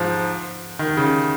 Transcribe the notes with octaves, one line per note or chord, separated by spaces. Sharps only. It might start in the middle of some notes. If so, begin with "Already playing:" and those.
Already playing: G#2 F3
D#3
C#3